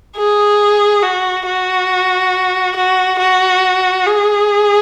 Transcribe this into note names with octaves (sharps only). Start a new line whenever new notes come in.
G#4
F#4
F#4
F#4
F#4
G#4